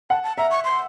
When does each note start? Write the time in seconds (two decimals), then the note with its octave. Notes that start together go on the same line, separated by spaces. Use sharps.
0.10 F#5 A5
0.23 A5
0.38 E5 A#5
0.51 C#6
0.64 C6